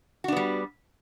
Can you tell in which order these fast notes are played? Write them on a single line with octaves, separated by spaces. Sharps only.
F#4 D4 B3 G3